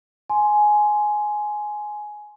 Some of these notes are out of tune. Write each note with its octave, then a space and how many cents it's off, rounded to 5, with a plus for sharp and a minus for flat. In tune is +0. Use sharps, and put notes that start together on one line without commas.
G#5 +10 C6 +0